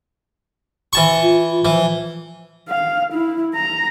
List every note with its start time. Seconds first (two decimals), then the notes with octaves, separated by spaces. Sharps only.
0.93 E3 A5 C#6
1.22 F4
1.65 E3 F3
2.69 F5
3.13 E4
3.54 A#5